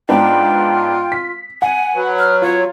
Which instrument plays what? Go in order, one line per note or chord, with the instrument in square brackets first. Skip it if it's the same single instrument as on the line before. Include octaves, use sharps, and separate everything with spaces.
[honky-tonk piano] G#2 B3 D4 [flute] F4 [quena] G5
[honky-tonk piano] B6
[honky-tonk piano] F#5 [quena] G#5
[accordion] F#3 [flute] B4
[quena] F6
[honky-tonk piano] F4 [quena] C#5